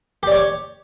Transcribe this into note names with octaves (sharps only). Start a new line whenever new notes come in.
G4 C#5 D5